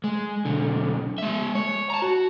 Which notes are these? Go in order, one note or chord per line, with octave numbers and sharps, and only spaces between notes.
G#3
B1 D3
G#3 E5
C#5
A5 A#5
F#4